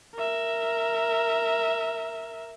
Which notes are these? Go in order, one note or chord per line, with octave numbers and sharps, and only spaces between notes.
A#4 E5